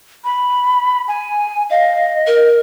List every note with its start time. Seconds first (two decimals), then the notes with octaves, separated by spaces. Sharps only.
0.24 B5
1.08 G#5
1.70 D#5 F5
2.27 A#4